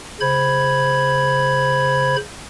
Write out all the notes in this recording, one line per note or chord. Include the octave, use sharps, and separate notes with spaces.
C#3 C5 B5 G#6